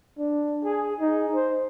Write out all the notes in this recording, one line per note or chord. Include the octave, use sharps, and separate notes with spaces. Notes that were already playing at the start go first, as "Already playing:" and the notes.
D4
G#4
D#4
C5